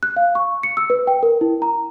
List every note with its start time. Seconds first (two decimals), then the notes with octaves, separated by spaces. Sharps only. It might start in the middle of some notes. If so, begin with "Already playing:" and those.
0.03 F#6
0.16 F5
0.35 C#6
0.63 C#7
0.77 E6
0.90 B4
1.07 G5
1.23 A#4
1.41 E4
1.62 A#5